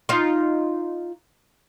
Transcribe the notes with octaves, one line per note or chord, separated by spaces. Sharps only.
D#4 F4